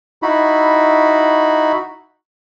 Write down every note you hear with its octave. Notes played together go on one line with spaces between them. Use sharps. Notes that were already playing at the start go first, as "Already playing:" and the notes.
D#4 E4 F#4 B5